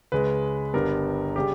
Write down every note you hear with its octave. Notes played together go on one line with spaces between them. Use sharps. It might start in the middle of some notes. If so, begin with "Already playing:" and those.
C#2 C#3 G#3 B4
G1 G2 G3 B3 A#4
C#3 G3 G4